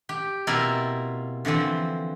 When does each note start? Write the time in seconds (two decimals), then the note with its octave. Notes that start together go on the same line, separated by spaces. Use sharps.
0.09 G4
0.47 B2 A#3 C4 E4 F4 A#4
1.45 D3 E3 F3 C4